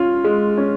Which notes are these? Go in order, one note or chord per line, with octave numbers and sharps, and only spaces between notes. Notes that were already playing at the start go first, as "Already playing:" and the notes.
Already playing: C#4 F4
G#3
C#4